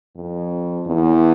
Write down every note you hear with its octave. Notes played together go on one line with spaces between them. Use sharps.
F2
E2